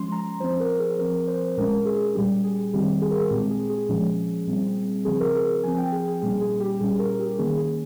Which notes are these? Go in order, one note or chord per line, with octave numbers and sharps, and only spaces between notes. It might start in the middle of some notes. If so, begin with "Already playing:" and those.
Already playing: F3 G#3 C#4 C6
A#5
F3 C4 C5
A#4
A#4
G#4
F3 C4 A#4
C5
A#2 G#3 C#4 A#4
G#4
A#2 G3 C#4 G4
G#4
D#3 G3 C4 G4
G#4
A#4
G#4
A#2 G#3 C4 G4
G#4
G#4
A#2 F3 G#3 C#4
A#2 G3 C4
C#3 F3 C4 G#4
A#4
G#4
F3 C4 G#5
G5
G#4
G#4
A#2 G3 A#3 C#4 G#4
G#4
G4
A#2 G3 C#4 G#4
A#4
G4
D#3 A#3 C#4 G#4
G#4